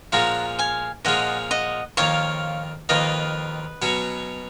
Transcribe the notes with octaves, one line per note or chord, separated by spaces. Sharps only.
A#2 F3 G#3 C#4 F4 F#5 A#5
F5 G#5
A#2 F3 G#3 C#4 F4 D#5 F#5
D#5 F#5
F2 D#3 A#3 F4 C#5 F5
F2 D#3 A#3 F4 B4 D#5
B2 F#3 C#4 F#4